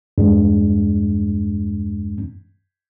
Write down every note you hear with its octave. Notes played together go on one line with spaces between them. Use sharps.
E2 G2 G#3 D4